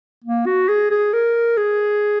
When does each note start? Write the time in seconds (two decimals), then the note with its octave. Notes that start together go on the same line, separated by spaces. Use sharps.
0.24 A#3
0.46 F#4
0.69 G#4
0.91 G#4
1.13 A#4
1.57 G#4